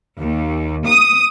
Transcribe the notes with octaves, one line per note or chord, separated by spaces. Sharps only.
D#2
D#6